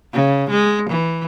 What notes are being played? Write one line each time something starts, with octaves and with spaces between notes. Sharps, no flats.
C#3
G#3
E3